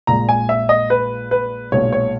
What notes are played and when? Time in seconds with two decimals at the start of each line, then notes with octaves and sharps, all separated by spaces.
0.07 A#1 A#2 G#3 A#5
0.29 G#5
0.49 E5
0.69 D#5
0.90 B4
1.31 B4
1.72 B1 A#2 G#3 C#5
1.92 C#5